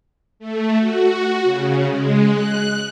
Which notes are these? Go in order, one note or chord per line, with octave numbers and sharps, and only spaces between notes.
A3
F#4
C#3
G#3
F#6